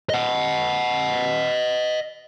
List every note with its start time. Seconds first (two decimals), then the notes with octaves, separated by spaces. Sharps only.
0.10 D#5 F#5